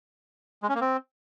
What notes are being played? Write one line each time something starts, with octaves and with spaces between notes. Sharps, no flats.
G#3
C#4
A#3
C4